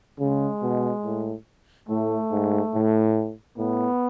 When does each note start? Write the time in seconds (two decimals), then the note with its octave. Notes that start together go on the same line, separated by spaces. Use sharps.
0.20 C#3 G#3
0.62 B2
1.05 A2
1.89 A2 A3
2.31 G#2
2.74 A2
3.57 A2 B3